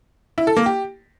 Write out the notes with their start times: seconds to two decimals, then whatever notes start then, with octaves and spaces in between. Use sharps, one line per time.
0.38 E4
0.47 A4
0.57 A#3
0.66 G4